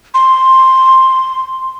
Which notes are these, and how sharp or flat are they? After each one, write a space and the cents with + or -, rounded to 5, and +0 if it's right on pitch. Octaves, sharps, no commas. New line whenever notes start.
C6 +5